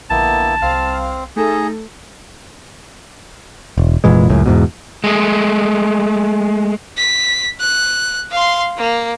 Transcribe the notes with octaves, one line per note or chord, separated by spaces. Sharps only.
A#1 D3 A#3 B3 E4 A5
C2 C4 F5 F6
A3 D#4 G#4 A4
E1
F1 A#2 E3 G#3
C#2 F#2 A2
E2 G#2 B2
G#3 A3
B6
F#6
F5 C6
A#3